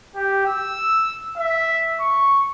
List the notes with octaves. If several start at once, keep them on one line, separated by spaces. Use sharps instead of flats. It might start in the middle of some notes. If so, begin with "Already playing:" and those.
G4
E6
E5
C#6